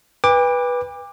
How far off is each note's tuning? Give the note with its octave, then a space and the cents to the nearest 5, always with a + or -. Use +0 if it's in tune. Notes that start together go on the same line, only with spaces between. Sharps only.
B4 -10 G5 +45 D6 +10